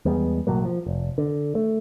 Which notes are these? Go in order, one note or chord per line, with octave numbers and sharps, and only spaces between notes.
E2 G3 G#3 B3
A1 B2 F#3 A#3
F3
F1
D3
A3